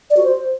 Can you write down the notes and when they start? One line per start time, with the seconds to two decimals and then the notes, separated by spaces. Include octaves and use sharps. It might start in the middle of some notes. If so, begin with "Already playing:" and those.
0.10 D5
0.17 F#4
0.23 C5